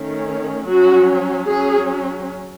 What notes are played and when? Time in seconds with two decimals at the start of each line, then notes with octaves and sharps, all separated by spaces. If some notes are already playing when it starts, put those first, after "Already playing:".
Already playing: D#3 A3 C#4
0.69 F#3 C#4 F#4
1.49 F#3 C#4 G#4